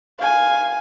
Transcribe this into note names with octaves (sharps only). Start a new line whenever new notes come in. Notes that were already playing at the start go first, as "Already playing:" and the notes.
F5 G#5